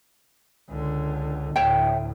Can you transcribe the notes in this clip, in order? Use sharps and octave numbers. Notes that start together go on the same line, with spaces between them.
C#2 D3
D2 A2 C#5 E5 G5